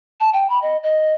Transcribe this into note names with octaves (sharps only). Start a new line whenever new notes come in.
A5
G5
B5
D#5
D#5